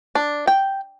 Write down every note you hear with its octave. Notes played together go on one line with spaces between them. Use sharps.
D4
G5